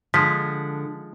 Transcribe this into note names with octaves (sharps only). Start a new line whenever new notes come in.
D3 F3 G#3 B6